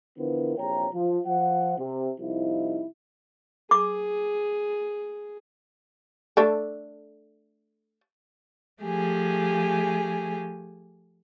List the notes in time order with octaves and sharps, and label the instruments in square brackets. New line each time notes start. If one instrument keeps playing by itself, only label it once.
[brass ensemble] D3 E3 F3 B3 E4 A#4
A#1 E2 C3 C#5 G5 A#5
F3
F3 F#5
C3
C2 F3 D#4 E4
[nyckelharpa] G#4 [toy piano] D6
[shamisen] A3 D4 A4
[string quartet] F3 A3 G4 G#4 G#5